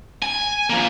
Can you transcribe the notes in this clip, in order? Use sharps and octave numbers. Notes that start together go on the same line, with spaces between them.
G#5
F3 A#3